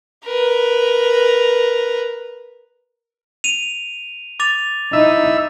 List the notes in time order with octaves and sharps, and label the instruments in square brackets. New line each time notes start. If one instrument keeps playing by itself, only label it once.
[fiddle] A#4 B4
[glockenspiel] D#7 F7
D6 A6 F7
[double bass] D#4 [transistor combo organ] E4 E5